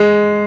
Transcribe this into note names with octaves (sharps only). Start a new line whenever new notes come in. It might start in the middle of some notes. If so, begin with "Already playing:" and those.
Already playing: G#3